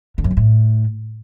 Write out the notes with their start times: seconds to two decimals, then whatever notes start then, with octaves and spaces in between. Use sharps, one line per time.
0.18 D3
0.24 F#2
0.31 B2
0.37 A2